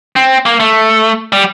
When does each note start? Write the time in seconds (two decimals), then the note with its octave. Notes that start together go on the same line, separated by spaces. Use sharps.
0.16 C4
0.46 A#3
0.60 A3
1.33 G3